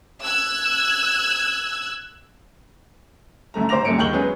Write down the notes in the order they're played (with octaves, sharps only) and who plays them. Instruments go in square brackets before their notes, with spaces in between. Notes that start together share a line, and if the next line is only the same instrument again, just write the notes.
[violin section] E6 F#6 G#6
[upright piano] F#2 D3 A3 A#5
G#1 C5 A#5 D6 A#6 F7
D#1 F#2 D3 A#3 C#7 D7
D#2 G#3 C#6 G6 F#7 G7
F#3 G#3 B3 C#4 G#4 B4